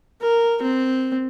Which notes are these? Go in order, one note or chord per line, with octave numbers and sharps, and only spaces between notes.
A#4
C4